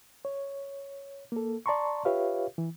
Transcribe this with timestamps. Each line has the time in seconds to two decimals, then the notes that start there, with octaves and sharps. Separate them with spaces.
0.25 C#5
1.32 A#3 A4
1.66 D5 A5 A#5 C6 C#6
2.05 F4 G4 B4 C#5 E5 F5
2.58 E3